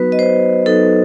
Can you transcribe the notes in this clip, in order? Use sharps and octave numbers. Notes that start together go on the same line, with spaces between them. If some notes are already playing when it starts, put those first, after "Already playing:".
Already playing: F#3 B3 D#4 F#4 B4
D#5
C5
F#3 B3 D#4 F#4 A4